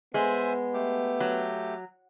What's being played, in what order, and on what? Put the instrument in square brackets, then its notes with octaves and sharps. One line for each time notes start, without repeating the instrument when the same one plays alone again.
[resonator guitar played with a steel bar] G#3 [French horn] B3 [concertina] C5 E5 G#5
[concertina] A3 G4
[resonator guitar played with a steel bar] F#3